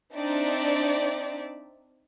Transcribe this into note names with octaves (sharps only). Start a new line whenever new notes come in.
C4 D4 D#4 D5 E5